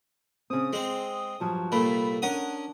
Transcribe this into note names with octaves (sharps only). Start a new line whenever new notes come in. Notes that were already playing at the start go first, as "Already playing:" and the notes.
C#3 C4 D#6
G#3 C4 G#4
G2 F3 F#3
C2 A#2 A3 A#3 B5
C#4 D4 A#4 F#5 D#6